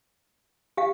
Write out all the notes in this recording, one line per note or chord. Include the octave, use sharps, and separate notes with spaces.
G4 F5